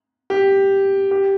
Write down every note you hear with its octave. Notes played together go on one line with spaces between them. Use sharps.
G4
G4